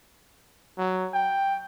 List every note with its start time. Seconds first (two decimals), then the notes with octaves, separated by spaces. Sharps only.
0.78 F#3
1.14 G5